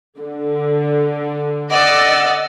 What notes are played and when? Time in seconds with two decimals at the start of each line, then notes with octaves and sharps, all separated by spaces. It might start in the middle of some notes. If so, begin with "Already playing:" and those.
0.19 D3
1.71 D5 D#5 F#5 E6 A6